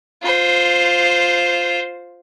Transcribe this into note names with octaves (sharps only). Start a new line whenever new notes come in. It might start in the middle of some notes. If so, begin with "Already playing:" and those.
F4 C5